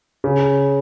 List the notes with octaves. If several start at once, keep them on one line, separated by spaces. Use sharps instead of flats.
C#3